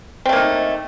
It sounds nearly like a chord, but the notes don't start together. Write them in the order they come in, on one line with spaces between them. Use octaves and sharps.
C4 A3 A#3 D#4